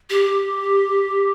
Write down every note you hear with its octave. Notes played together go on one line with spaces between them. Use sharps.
G4